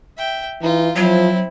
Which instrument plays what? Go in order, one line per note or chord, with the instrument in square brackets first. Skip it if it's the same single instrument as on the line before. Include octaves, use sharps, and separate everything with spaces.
[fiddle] E5 G5
[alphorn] E3 [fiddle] D#4 F4
[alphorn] F3 [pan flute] F#3 [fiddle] C4 E4